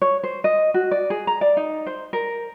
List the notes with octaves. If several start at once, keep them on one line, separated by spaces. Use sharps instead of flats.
C#5
C5
D#5
F#4
D5
G#4
A#5
D5
D#4
C5
A#4